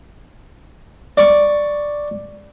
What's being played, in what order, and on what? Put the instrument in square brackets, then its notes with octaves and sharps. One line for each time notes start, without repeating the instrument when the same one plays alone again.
[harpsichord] D5 C#6